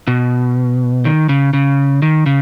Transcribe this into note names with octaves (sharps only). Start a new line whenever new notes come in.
B2
D#3
C#3
C#3
D#3
C#3